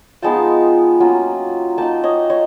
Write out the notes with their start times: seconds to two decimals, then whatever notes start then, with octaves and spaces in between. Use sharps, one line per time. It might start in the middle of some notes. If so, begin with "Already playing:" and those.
0.22 F3 G#3 B3 D#4 G5 A5
1.00 F#3 A#3 C#4 F4
1.78 A#3 D#4 G5 A5
2.04 C#5 D#5
2.30 C#5 D#5